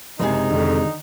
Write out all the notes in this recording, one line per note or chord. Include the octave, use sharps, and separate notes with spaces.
F#1 C3 G#3 C4 D#4 G#5
F2 D3 D#3